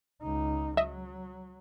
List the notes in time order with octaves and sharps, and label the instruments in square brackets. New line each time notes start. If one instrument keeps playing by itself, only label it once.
[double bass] C#2 D#4
[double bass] F#3 [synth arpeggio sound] D#5 E5